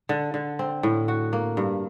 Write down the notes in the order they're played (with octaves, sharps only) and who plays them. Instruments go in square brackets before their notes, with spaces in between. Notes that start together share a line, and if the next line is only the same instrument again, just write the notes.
[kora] D3
D3
C4
A2
F#4
A#3
G2